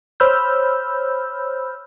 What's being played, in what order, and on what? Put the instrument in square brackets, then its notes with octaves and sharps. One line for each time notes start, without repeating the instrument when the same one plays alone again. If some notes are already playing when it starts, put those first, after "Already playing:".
[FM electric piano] C5 C#5 B5 E6 F6 G6